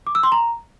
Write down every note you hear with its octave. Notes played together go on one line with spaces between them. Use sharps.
D6
E6
C6
A#5